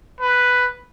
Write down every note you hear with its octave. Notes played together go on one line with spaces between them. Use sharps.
B4